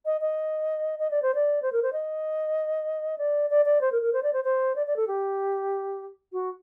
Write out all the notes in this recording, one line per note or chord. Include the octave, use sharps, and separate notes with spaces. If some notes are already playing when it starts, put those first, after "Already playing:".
D#5
D#5
D#5
D5
C5
D5
C5
A#4
C5
D#5
D5
D5
D5
C5
A#4
A#4
C5
D5
C5
C5
D5
D5
A4
G4
F#4